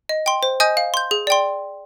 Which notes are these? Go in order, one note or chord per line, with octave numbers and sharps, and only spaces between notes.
D#5
G5 C6
C5
D#5 G#5 D#6 G6
F5
C6 G6
G#4
D5 G5 C6